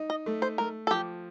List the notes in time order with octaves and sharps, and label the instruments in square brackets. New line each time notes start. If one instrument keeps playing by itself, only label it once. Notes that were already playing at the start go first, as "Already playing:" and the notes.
Already playing: [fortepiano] D#4
[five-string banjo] D#5
[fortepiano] A3
[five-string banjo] C5
[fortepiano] A3 [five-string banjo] A#4
[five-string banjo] A4
[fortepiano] F3 [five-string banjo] G4